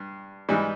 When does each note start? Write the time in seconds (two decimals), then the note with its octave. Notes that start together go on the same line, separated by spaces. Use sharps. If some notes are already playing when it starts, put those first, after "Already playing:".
Already playing: G2
0.49 G#2 E3 G3